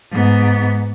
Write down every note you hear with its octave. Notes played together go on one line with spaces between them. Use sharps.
G#2 B3